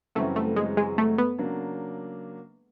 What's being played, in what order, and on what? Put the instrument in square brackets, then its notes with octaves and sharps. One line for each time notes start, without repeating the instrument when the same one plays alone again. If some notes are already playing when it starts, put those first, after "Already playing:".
[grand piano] F#2 C#3 E3 G3 C4 [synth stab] A3
[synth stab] A3
G#3
G#3
A3
B3
[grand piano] C#3 F#3 A#3 D4